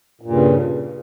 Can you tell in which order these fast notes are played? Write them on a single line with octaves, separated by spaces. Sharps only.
A#2 G2 C#3